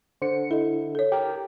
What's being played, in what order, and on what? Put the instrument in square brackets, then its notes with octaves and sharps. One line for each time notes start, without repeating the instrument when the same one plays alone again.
[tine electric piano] D3 [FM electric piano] C5 C#7
[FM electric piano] E4 [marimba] A4 D#5
[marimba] A4 C#5
[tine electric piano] G4 A#4 [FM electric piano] G5